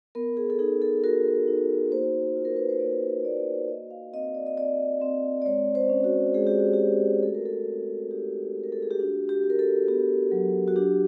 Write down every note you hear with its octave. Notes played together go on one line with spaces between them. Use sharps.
B3 A#4
G#4
A4
D#4 G#4
A4
F#4 A#4
D#4
A#3 C5
F4
A#4
B4
C5
A#3 C#5
A#3 D5
F#4 D#5
F5
C4 D#5
D5
D#5
C4 D5
C4
D5
G#3 C#5
C5
C#4
F#4
G#3 G#4
G4
F#4
G4
F#4
A3 A4
A#4
A4
C4
D#4 G4
A3
A#4
A4
G#4
G4
D4 F#4
G4
F#4
A#4
A4
B3 G4
F#3
F#4
D4 G4